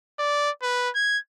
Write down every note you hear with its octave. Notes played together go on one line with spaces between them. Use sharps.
D5
B4
G#6